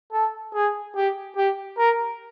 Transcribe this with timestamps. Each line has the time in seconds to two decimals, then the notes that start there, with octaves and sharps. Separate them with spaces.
0.13 A4
0.54 G#4
0.96 G4
1.37 G4
1.78 A#4